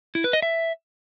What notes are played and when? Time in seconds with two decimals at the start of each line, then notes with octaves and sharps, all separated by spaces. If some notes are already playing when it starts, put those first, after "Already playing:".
0.15 E4
0.24 B4
0.33 D#5
0.42 E5